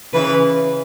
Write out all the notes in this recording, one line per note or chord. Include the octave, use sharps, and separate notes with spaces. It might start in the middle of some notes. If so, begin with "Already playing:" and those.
C#3 E3 B4